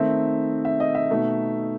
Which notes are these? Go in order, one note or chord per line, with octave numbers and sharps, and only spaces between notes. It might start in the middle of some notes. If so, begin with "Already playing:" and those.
Already playing: D#3 A3 C4 D#4 E5
E5
D#5
E5
B2 A3 D#4